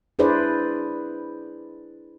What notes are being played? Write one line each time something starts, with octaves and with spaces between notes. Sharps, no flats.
D4 E4 G#4 B4 C5 D5